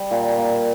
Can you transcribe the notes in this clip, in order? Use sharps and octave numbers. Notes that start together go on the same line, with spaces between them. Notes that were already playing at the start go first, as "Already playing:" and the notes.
Already playing: G3
A#2
A#3